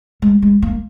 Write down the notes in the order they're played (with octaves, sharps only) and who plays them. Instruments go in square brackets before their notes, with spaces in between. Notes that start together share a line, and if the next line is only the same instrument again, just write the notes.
[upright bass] G#3
G#3
A#3